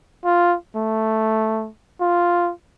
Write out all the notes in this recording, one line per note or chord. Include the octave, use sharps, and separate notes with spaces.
F4
A3
F4